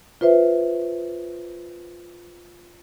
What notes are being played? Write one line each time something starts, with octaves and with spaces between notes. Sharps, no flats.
F4 B4 C5 E5